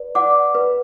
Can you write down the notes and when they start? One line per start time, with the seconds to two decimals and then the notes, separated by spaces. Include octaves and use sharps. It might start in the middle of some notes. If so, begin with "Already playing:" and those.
Already playing: B4 D5
0.15 D5 F#5 D6
0.55 B4